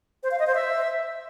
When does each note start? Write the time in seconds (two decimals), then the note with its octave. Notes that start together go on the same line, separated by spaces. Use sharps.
0.23 C5
0.31 F5
0.39 D#5
0.47 C5
0.55 E5